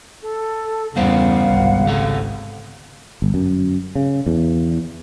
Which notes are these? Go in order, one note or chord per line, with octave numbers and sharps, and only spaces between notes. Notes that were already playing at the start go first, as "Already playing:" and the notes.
A4
E2 G2 C#3 G3 B3 C5 F5 F#5
G#1 C#2 C3
C#3 A4 A#5
G1
F#2
C#3
E2